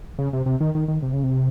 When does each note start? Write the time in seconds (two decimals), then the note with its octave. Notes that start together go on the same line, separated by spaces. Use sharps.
0.19 C#3
0.33 C3
0.46 C3
0.61 D#3
0.75 D#3
0.88 D#3
1.03 C3
1.13 C#3
1.23 C3